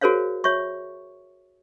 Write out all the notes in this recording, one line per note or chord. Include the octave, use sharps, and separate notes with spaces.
F#4 G#4 A#4 C5 C#5 F5
F#4 C#5 E5 C#6